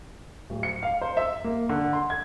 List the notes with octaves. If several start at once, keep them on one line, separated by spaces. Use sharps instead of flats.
D1
C#7
F5
C5
E5
A#3
D3
C6
G#6